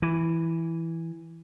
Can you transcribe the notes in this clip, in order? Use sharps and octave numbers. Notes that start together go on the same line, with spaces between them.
E3